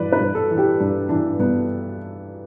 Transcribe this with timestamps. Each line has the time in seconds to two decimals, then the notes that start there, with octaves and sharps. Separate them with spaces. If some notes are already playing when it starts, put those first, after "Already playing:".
Already playing: G2 E3 B4 D5
0.12 B4
0.20 G2
0.35 A4
0.50 E3
0.58 G4
0.80 G2 D4
1.09 E3 D4
1.39 G2 B3